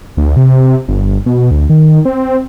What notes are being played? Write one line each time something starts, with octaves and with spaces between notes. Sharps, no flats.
D2
C3
G1
B2
D2
D#3
C4